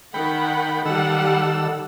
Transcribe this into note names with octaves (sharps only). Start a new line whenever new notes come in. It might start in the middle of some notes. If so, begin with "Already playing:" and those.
D#3 F#5 G5 B5
D#3 G3 A4 F#5 E6